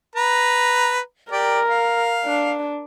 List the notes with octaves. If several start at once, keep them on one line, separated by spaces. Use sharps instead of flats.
B4 A#5
G4 A#4 D5
F5
D4